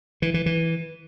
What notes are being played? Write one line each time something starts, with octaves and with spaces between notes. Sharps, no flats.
E3
E3
E3